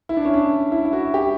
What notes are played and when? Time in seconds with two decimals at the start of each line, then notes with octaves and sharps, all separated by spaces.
0.09 E4
0.17 D4
0.25 C#4
0.34 D4
0.72 E4
0.85 E4
0.93 F#4
1.14 G4